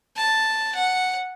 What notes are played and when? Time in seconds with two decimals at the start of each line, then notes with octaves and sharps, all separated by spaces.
0.16 A5
0.75 F#5